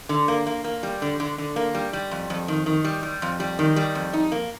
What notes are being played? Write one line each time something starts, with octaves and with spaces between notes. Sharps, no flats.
D3
A#3
A#3
A#3
G3
D3
D3
D3
A#3
G3
G3
F2
F2
D#3
D#3
G3
G3
F2
G3
D#3
G3
F2
D#4
A#3